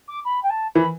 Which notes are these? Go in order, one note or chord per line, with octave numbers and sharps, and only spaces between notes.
D6
B5
G5
A5
E3 B5